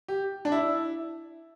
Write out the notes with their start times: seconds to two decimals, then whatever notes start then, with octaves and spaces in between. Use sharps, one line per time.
0.08 G4
0.45 D4
0.52 E4